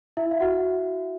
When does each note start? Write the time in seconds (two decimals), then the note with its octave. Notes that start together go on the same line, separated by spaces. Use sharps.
0.17 E4 E5
0.31 F5
0.40 F#4 F#5